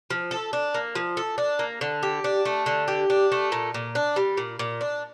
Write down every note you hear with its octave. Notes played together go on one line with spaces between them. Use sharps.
F3
A4
D4
A#3
F3
A4
D4
A#3
D3
G4
D4
A3
D3
G4
D4
A3
A#2
A#2
D4
G3
A#2
A#2
D4